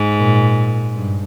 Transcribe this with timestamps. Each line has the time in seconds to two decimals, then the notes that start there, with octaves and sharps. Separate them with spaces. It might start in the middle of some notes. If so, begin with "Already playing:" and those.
Already playing: G#2
0.15 A#2
0.96 G2